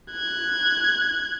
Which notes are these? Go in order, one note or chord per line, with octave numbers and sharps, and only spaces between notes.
F#6 G#6